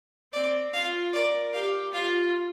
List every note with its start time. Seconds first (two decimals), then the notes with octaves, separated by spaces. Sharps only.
0.33 C4 D5
0.73 F4 F5
1.13 A#4 D5
1.53 G4 F5
1.93 F4 F5